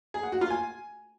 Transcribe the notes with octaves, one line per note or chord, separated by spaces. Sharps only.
G#4
F#5
F#4
F4
G#5